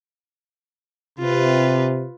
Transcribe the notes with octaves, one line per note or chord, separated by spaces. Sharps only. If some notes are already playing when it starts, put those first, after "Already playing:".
C3 F4 B4